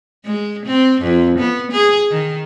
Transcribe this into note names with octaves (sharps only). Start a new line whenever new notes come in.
G#3
C4
F2
B3
G#4
D#3